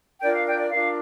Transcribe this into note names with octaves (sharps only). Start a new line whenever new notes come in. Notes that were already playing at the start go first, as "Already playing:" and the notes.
D4 F4 A#4 D5 G5
F5
D5 G5
D5
D4 F4 A#4 F5